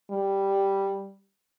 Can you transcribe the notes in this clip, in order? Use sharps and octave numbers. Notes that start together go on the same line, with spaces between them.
G3